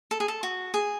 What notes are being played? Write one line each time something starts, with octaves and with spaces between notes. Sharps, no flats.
A4
G#4
A4
F#4
G#4